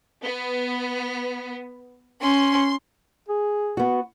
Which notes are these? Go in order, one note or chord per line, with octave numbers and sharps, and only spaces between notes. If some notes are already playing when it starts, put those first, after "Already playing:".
B3
C#4 C6
G#4
B3 F#4